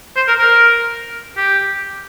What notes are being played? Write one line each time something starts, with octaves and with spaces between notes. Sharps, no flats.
C5
A#4
A#4
G4